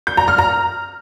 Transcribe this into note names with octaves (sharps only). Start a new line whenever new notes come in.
G6
A#5
F6
A#5